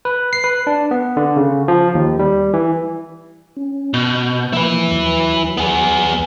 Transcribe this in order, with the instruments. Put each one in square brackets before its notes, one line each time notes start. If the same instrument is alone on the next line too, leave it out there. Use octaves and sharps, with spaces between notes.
[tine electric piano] B4
C7
B4
D4
B3
D3
C#3
F3
D#2
G3
E3
[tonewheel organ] C#4
[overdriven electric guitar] B2 [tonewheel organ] G6
[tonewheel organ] F3 A#3 [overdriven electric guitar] E4 B4
[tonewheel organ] D#2 F#3
[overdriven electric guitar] B3 G#4